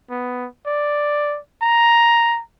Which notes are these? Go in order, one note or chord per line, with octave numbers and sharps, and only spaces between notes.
B3
D5
A#5